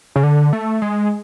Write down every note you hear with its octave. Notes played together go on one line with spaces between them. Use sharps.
C#3
D3
A3
G#3